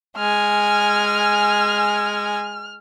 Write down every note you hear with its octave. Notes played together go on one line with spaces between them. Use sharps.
G#3 G#5 F6